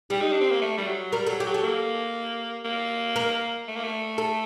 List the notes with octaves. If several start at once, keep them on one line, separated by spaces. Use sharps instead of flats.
G3 G4
D#4
D4
C4
A#3
A3
G3
F#3
G3 A#4
F#3 A4
G4
F#3
A4
A#3
A#3
A#4
A3
A#3
A3
A4